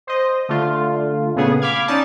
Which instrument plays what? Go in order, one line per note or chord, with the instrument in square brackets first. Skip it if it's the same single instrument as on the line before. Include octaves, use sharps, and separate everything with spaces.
[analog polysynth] C5 D#5
D3 A3 F4
A#2 C#3 A3 B3 G#4
F5 B5 D6 F6 G#6
C#4 D#4 D5 A5